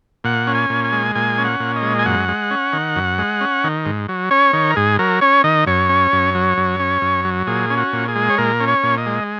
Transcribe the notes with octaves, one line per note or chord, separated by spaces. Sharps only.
A#2 F#5
C#4
G#5
A#2
G#5
G#3
A#2 G#5
C#4
F#5
A#2
D#5
G#3
G#5
F#2 F#5
G#3
C#4
D#3
F#2
G#3
C#4
D#3
G#2
F#3
C#4 C#5
D#3
A#4
G#2 G#4
F#3 A#4
C#4 C#5
D#3 D#5
F#2 C#5
C#4
F#2
F#3
F#2
C#4
F#2
F#3
A#2 G#4
C#4
F#4
A#2
G#4
G#3
C#5
A#2 A#4
C#4
C#5
A#2
D#5
G#3